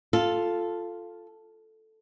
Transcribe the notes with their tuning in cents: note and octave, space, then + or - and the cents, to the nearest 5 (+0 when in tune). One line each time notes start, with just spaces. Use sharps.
F4 +0 A4 +0